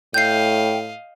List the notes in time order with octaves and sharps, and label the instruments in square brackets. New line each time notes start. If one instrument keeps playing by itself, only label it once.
[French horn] A2 [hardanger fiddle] D#5 F5 [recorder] G5 [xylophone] G6 C7